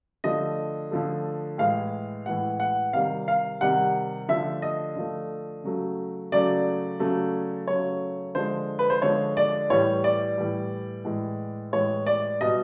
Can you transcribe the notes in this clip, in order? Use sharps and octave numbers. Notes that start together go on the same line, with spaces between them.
D3 F3 A3 D#5
D3 F3 A3
A2 E3 G#3 F5
A2 E3 G#3 F#5
F#5
C3 D#3 G3 F5
F5
C3 D#3 G3 F#5
D3 F3 A3 E5
D#5
D3 F3 A3
C#3 F#3 A3
C#3 F#3 A3 D5
C#3 F#3 A3
C#3 F#3 A3 C#5
D3 F3 G#3 C5
B4
C5
D3 F3 G#3 C#5
D5
A2 E3 G3 C#5
D5
A2 E3 G3
A2 E3 G#3
A2 E3 G#3 C#5
D5
B2 G3 D#5